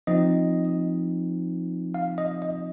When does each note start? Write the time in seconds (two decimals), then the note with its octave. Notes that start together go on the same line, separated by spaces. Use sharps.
0.07 F3 C4 D#4 D#5
1.94 F5
2.18 D#5
2.42 D#5